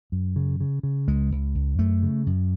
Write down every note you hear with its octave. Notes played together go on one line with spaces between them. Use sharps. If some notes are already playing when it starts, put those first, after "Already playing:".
F#2
C#3
C#3
C#3
C#2 G#3
C#2
C#2
F#2 A3
C#3
F#2